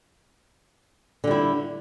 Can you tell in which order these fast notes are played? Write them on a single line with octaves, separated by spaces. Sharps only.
D3 G3 E4